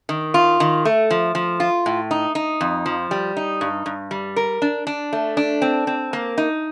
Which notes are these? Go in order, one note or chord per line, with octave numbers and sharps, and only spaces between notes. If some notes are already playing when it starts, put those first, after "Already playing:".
D#3
F4
D#3
A3
F3
F3
F4
A2
D#4
D#4
F2
F3
G3
D#4
G2
G2
G3
A#4
D4
D4
A3
D4
C4
C4
A#3
D#4